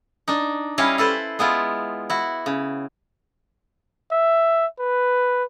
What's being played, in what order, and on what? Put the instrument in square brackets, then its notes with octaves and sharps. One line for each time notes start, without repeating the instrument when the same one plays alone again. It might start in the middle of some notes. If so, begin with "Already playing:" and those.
[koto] D4 D#4
G3 C#4 E4 C#5 D#5 F5
E4 A4 B4 C5
G#3 B3 E4 F4
E4 F#4
C#3
[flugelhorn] E5
B4